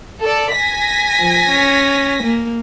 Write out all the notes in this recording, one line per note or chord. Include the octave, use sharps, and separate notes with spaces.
A4 D5
G#5 A#6 B6
F3
C#4
A#3